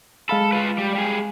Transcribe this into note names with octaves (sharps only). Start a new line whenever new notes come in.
G#3 A4 F5 B5
F4 B4
G3
G3 G#4